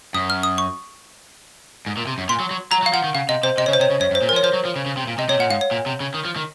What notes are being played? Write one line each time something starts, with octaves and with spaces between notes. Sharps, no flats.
F#2 D#6
F6
D#6
C#6
G#2
A#2
C3
F#2
A#2 C6
F#3
F#3
F#3 A#5
F#3
F5
F3 F#5
D#3
C#3 F5
C3 D#5
C3 C5
C3 D#5
C#3 C#5
C5
C3 C#5
C#3
F#2 C#5
F#2
C5
A#2
F3 A#4
C#5
F3 C5
F#3
F3
C#3
C#3
C3
A#2
C3 D#5
C3 C#5
A#2 F#5
G#2 F5
C#5
A#2
C3
C#3
D#3
F3
D#3